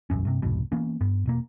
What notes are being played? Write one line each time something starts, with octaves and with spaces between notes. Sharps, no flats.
E1 A1 F#2 C#4
G2 C3
C2 F2 G#2 B2
E3 A#3 B3 C#4
G2 B3
E1 B2 A#3